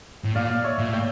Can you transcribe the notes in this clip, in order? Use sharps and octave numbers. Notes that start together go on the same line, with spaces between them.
A2
A#2 D5 F5
C#5 E5
A#2
A2
E5 G5